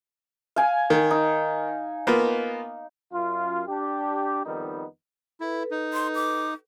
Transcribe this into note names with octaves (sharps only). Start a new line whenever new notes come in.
F5 G#5
D#3
D#4
A#3 B3 F4
F#2 F4
D4 G4
F2 D#3 G3 B3 D#4
E4 A4 B4
D#4
C6
D6